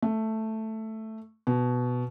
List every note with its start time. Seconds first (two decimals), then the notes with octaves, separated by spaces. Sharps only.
0.02 A3
1.47 B2